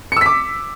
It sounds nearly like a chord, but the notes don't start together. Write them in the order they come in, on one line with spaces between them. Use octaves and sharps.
C#7 E6 B6 D6